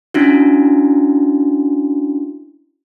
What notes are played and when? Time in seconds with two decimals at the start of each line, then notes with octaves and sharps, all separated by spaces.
0.14 C#4 D4 E4 F#4